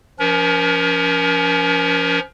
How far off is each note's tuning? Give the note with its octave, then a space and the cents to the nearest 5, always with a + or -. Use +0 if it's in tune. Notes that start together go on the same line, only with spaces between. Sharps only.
F3 -10 C#4 +35 A#4 +30